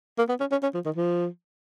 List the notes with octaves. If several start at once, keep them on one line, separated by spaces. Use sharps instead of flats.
A#3
B3
C#4
C#4
C#4
F3
D#3
F3